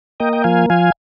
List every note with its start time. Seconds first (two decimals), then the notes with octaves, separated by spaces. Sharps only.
0.20 A#3 D#5 G5
0.33 G5
0.44 F3 F5 G#5
0.70 F3 F5 G#5